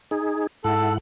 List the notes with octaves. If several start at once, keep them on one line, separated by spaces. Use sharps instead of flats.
D#4 G#4
G#2 E4 A4 F#5